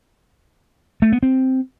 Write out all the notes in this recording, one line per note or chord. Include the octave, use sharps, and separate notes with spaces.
A3
B3
C4